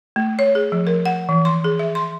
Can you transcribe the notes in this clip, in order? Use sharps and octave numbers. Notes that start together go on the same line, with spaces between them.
A3
C#5
G#4
F3
A#4
F#5
E3
C6
G#4
E5
C6